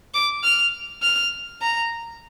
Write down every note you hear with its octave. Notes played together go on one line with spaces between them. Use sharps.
D6
F6
F6
A#5